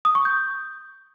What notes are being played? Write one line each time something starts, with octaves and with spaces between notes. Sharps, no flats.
D#6
C#6
G6